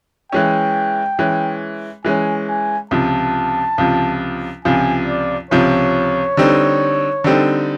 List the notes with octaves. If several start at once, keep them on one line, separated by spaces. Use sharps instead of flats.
E3 G#3 C#4 G5
E3 G#3 C#4
E3 G#3 C#4 G#5
G#5
C#2 C3 F3 A5
C#2 C3 F3
C#2 C3 F3 G#5
D5
C#2 C3 F3 C#5
D3 G3 C4 D#4
D3 G3 C4 D#4